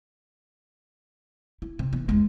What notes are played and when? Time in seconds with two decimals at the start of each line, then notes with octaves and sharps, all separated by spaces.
1.62 E4
1.79 C3
1.92 E3 B3
2.09 E2 G#3